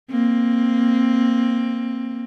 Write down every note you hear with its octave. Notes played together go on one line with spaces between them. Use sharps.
A#3 C4